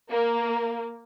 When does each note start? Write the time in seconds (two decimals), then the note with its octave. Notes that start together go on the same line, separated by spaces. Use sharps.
0.10 A#3